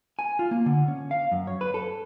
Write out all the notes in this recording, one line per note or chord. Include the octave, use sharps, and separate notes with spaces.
G#5
F4
A#3
D3
C#4
F5
F#2
C#5
B4
A4